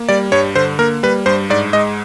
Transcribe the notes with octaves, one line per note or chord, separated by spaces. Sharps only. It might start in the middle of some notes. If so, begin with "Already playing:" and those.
Already playing: A#3
G3 D5
G2 C#5
D3 C5
A#3 A#4
G3 B4
G2 C5
G#2 D5
G#3 D#5